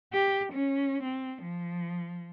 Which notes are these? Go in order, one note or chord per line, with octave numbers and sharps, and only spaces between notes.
G4
C#4
C4
F3